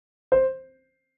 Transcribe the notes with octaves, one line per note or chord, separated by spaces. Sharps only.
C5